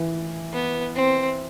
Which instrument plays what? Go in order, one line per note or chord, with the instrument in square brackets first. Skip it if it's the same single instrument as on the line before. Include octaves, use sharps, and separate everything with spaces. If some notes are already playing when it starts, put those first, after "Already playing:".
Already playing: [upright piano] E3
[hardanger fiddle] B3
C4